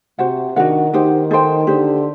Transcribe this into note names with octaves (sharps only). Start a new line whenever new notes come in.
C3 F#4 C5 F#5
D#3 D4 F#4 A#4 F#5
D#3 D#4 G4 C5 F#5
D#4 A4 C5 G5
D3 D#4 G4 C5